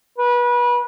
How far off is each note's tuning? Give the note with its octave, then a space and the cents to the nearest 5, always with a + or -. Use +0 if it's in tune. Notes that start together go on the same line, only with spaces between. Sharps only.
B4 -30